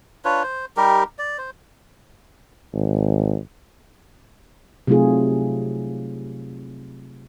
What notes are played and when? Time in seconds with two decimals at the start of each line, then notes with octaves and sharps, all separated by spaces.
0.25 D4 F4 B4 C#5
0.43 C5
0.77 G3 D#4 G4 A#4
1.19 D5
1.38 C5
2.73 G#1
4.87 C3 F#3 A3 D#4 F4 G#4